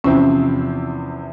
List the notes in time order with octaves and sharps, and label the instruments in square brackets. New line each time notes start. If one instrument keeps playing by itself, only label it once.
[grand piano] E2 C3 F3 C4 E4 [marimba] C#4